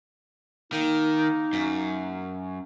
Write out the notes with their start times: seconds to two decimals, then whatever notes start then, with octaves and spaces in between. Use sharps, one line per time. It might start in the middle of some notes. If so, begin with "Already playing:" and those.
0.72 D#3 A#3 D#4
1.53 F#2